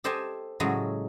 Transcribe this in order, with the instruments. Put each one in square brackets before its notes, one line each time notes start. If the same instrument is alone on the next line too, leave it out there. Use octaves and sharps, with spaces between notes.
[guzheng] G4 A4 C5 D#5 G#5 A5
A2 C#3 F#3 G#3 A4